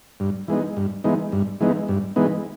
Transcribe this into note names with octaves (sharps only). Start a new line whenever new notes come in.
G2
E3 G#3 B3 D#4
G2
E3 G#3 B3 D#4
G2
E3 G#3 B3 D#4
G2
E3 G#3 B3 D#4